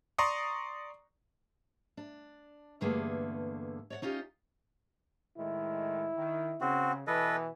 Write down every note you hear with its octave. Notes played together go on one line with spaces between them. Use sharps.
D5 A#5 C6 C#6 D#6
D4
E2 G2 D3 A3 A#3 G#4
C#5 D5 F#5
C#4 D#4 F4 G4
A2 D#3 G#3 E4
D#3
C#3 C4 F#4
B2 E3 A4 B4 D#5